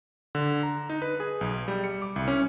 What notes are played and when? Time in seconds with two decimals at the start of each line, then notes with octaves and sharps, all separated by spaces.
0.35 D3
0.63 A#5
0.90 D#4
1.02 B4
1.20 G#4
1.41 B1
1.68 G3
1.84 C#7
2.02 D6
2.16 C2
2.28 C#4